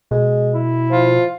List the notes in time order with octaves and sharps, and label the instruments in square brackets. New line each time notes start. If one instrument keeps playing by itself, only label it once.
[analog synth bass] B2 [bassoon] G#3
[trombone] E4
[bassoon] F3 [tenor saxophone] F4